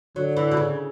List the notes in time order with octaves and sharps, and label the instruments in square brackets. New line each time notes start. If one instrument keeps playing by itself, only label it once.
[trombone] D3 [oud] F#3
[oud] E3
B2
C#3